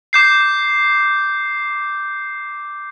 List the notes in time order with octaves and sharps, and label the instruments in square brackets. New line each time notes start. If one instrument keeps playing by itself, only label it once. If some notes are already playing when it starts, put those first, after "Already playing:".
[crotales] D6 G6 C7